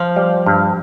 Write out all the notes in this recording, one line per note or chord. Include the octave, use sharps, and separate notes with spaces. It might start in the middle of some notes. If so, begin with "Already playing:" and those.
Already playing: F3
G3
G2